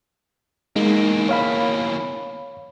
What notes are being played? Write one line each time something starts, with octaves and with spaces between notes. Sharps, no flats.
E2 G#3 A#3 D#4
C#5 F5 B5